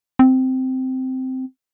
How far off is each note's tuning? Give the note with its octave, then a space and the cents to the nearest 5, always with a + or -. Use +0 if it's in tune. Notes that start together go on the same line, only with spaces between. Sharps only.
C4 -10